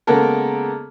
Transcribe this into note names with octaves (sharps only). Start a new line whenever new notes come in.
C#3 G#3 A#3 B3 A4 A#4